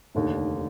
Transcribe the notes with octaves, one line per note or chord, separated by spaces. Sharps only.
F1 D#2 D3